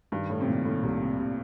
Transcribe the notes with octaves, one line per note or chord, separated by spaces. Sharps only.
G2 D#3
A2 G3
C3
A#2 D#3
A2 D#3
C2 A#2
C3
C3